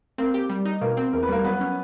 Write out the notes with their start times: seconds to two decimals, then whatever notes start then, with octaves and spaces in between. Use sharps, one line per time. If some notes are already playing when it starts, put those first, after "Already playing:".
0.18 A#3 C4 A#4
0.34 G4
0.50 G3
0.65 D#4
0.81 B2 A#3 A#4
0.97 C4
1.13 E2 A#4
1.23 B4
1.29 G3 A#3 A#4
1.44 F#3 B3 B4
1.61 C#4